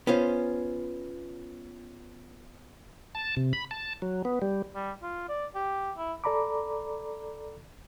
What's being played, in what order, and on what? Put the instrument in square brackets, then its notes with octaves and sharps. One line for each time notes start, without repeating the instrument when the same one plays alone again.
[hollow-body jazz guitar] B3 C#4 F4 C5
[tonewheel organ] A5
C3
B5
A5
F#3
B3
G3
[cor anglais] G3
F4
D5
G4
E4
[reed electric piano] A4 D5 A#5 B5 D6